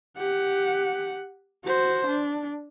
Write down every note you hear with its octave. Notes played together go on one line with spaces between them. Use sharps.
G4 F#5
F#4 C5
D4